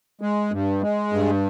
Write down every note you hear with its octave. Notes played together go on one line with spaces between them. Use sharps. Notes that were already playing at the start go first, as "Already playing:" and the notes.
G#3
G2
G#3
G2